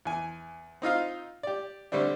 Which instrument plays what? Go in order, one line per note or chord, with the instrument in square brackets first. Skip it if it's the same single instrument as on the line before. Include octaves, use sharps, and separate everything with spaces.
[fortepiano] E2 G#5
C4 D#4 F4 F5
G4 D5
D3 G3 A3 C4 D4